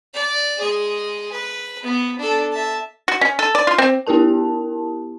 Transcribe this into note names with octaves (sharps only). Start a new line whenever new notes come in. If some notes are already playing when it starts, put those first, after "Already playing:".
D5
G#3 G#4
B4
B3
D4 A4
E5 A5
F#4
C#4
A4
D5
F4
C4
B3 E4 G4 A#4 A5